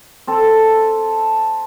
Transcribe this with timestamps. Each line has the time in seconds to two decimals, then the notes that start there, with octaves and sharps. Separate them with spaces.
0.27 C4 A4